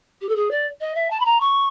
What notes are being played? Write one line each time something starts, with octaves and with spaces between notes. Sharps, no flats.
G4
A4
G#4
D5
D#5
E5
A5
B5
A#5
C#6